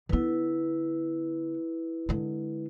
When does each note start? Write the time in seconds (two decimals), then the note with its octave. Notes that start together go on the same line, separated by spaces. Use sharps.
0.09 D3 B3 E4 B4
2.09 D3 G#3